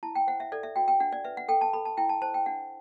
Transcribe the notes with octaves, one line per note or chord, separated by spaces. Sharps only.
E4 A5
G5
C5 F#5
E5
A4 D5
E5
F#4 G5
G5
D4 F#5
D5
B4 E5
F#5
A4 G5
A5
A4 B5
A5
E4 G5
A5
C5 A5
G5
D4 F#5